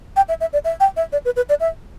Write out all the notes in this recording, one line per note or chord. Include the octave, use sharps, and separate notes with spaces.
G5
E5
E5
D5
E5
G5
E5
D5
B4
B4
D5
E5